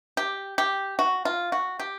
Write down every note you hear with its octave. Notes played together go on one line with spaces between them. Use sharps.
G4
G4
F#4
F4
F#4
G4